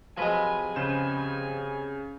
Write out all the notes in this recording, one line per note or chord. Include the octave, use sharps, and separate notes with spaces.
C3 F3 F#3 G#3 G#4 B4 G#5
C#3 B4 C5 E7